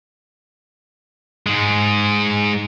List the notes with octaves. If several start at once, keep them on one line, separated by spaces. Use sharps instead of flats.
G#2 G#3